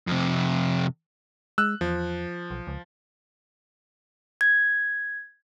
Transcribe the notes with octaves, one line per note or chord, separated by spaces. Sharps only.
F2 C3
G#3 E6 F#6
E2 F3
B1
C#2
G#6